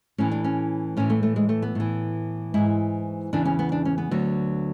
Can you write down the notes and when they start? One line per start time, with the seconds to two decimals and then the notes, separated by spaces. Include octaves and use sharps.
0.18 A2 E3 C#4
0.31 D4
0.44 C#4
0.97 A2 E3 C#4
1.10 A3
1.23 A3
1.36 G#3
1.49 A3
1.62 B3
1.75 A2 E3
2.54 G#2 E3 E4
3.33 E2 C#3 E3 D4
3.45 C#4
3.59 B3
3.72 D4
3.85 C#4
3.98 B3
4.11 D2 D3 F#3